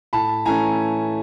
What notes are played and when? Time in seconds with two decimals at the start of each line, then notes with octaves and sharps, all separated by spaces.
0.13 A2 A5 B5
0.46 E3 A3 C#4 G#5 A#5